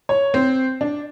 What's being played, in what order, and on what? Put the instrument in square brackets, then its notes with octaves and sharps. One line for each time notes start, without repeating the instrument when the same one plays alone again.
[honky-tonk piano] C#5
C4
D4